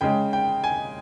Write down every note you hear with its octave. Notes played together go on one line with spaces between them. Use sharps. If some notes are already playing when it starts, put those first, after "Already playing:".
C#3 G#3 G5
G5
G#5